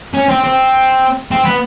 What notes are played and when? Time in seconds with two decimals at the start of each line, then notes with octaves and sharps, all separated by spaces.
0.14 C#4
0.29 C4
0.44 C4
1.31 C4
1.45 B3